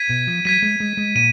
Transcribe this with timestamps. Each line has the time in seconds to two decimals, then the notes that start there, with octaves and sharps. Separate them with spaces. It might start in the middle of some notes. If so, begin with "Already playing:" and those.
Already playing: G#6 B6 D#7
0.09 B2
0.27 F3
0.45 F#3 G#6 B6 D#7
0.62 G#3
0.80 G#3
0.97 G#3
1.15 A#2 D#7